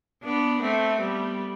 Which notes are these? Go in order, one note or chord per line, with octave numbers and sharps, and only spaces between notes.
B3 D4
A3 C4
G3 B3